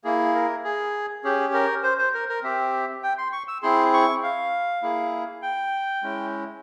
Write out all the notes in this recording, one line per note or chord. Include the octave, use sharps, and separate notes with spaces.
A#3 E4 G#4
A#4
G#4
C#4 G4 G#4
A#4
C5
C5
A#4
A#4
C4 G4 E5
G5
C6
C#6
E6
C4 E4 G#4 C6
C#6
F5
A#3 E4 G#4
G5
G#3 C#4 E4